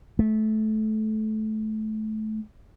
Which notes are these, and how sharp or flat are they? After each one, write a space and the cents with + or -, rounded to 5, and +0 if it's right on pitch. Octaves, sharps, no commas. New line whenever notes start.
A3 -20